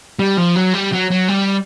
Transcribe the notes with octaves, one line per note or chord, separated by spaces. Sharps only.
G3
F3
F#3
G3
F#3
F#3
G3